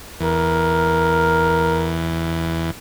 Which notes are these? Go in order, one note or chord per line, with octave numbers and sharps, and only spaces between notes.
E2 A#4